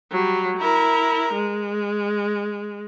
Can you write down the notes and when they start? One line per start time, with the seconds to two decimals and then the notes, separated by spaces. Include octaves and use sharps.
0.12 F#3 G3
0.57 E4 A#4
1.34 G#3